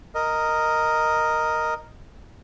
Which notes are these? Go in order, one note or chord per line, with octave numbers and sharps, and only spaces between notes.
A#4 D#5